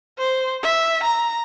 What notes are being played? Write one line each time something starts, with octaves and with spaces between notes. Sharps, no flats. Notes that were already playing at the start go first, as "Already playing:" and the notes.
C5
E5
A#5